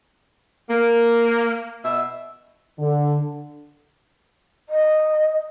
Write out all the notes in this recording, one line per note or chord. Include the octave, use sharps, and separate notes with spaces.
A#3
B2 E5
D3
D#5